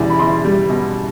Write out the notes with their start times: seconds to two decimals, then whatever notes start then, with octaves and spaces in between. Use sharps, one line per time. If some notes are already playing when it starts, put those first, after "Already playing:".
Already playing: E2 B2 G3 D5
0.10 B5
0.19 E2 C6
0.45 G3
0.69 B2